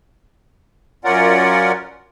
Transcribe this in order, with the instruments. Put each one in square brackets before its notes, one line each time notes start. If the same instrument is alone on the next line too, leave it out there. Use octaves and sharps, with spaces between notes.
[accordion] F#2 C#4 F4 A#4 D5 F#5